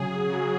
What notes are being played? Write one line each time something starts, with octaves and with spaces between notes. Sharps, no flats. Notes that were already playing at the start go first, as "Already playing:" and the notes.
Already playing: C#3 F#3 G#4
C#3 F#3